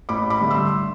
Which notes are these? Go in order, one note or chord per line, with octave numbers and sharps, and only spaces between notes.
A1 B5 D6
B5 D6
G2 D3 A3
C6 E6